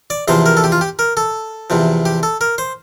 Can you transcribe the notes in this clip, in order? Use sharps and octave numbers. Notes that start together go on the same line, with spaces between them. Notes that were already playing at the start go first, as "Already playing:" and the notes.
D5
E2 C3 F3 C5
A#4
A4
G4
F4
G4
A#4
A4
E2 C3 F3
G4
A4
A#4
C5